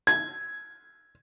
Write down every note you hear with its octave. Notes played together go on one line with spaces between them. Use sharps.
G#6